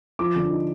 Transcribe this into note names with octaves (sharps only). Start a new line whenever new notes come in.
F3 D6
D3
D#4